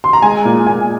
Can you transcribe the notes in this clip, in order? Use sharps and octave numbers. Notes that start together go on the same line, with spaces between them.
C6
A#5
G#3 G#5
A#2
A#2 G#5